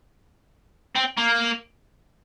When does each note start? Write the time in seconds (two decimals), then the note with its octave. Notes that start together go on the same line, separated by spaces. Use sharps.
0.96 C4
1.17 A#3